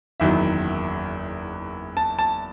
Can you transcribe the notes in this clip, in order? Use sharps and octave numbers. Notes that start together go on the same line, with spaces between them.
F#1 E2 D#3 F#3 E5
A5
A5